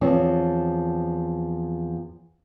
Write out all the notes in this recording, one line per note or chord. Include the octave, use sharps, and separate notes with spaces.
E2 F3 C4 C#5